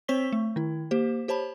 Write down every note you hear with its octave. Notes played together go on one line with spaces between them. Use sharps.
C4 C5 C#5 C#6 B6 G7
A3
D#3 E4
A#3 G4 C5
G4 C5 C#5 A5 B5